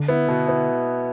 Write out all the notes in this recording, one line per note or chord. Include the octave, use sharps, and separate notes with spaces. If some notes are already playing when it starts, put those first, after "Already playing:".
Already playing: D3
B3 E4
B2
B3 E4